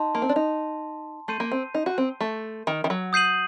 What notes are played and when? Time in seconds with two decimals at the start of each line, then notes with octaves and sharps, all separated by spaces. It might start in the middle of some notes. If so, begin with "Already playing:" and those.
Already playing: D#4 A5 C6
0.15 A#3
0.22 C4
0.29 D4
0.36 D#4
1.28 A3 C6 G6 C7 D#7
1.40 A#3
1.52 C4
1.74 D#4
1.86 F#4
1.98 C4
2.21 A3
2.67 D#3
2.84 D#3
2.90 F#3
3.13 D#6 G6 C7 D#7 F#7